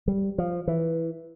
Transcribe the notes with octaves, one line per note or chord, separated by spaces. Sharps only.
G3
F3
E3